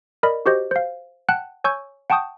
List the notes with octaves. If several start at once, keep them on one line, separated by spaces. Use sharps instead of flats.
A#4 D5 D#5 B5
F#4 G4 C5 D#5
C5 F5
F#5 G5 A5 F#6
C#5 G#5 C#6 E6 G6
F#5 G5 A5 C#6 D#6 G6